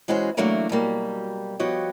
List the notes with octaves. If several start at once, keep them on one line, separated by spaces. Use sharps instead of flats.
E3 G#3 C#4 F#4 C5
E3 F#3 A3 A#3 D4 F#4
B2 F#3 G3 A#3
F3 B3 F#4 G4 C#5 D#5